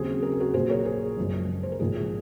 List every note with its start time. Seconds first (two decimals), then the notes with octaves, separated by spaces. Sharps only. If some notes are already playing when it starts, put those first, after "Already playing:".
Already playing: D#2 C#3 F#3 C4 G#4
0.23 A#4
0.32 G#4
0.40 F#4 A#4
0.54 A#1 A#2 F#3 G#4 C5
0.70 A#4 C#5
0.85 G#4 C5
1.17 F#1 F#2 F3 G#3
1.63 C5
1.72 A#4
1.80 A#1 G#2 F3 G#4